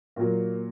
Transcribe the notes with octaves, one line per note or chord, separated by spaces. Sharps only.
A#2 F#3 A#3